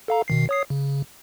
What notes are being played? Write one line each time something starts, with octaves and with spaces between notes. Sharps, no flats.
A4 F5 A#5
B2 D#3 C7
C#5 D#6 C7
C#3